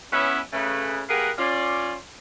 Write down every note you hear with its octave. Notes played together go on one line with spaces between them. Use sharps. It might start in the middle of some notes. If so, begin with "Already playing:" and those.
B3 C#4 E4
C#3 A3 B4
A#3 G4 G#4 A#4 B4 F#5
C#4 F4 D5